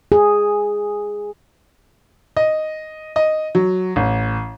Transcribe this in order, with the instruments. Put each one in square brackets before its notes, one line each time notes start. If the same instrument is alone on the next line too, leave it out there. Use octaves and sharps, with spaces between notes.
[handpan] G#4
[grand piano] D#5
D#5
F#3
A1